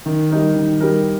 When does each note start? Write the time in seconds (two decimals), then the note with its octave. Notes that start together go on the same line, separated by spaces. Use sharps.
0.06 D#3
0.31 G3 D#4 A#4
0.55 D#3
0.80 G3 D#4 A#4